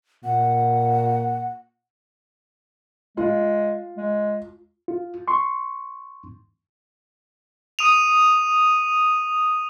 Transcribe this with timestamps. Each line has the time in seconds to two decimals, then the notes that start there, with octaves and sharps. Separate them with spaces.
0.24 A#2 F#5
3.17 G#3 F4
3.97 G#3
4.88 F4
5.28 C6 C#6
7.79 D#6 D#7 F7